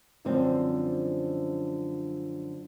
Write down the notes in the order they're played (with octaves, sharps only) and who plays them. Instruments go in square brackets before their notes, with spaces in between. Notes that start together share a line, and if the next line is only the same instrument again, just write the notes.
[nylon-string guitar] F#2 D3 F3 G3 C4